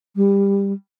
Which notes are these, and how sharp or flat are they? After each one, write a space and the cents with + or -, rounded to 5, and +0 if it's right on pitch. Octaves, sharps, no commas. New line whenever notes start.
G3 +20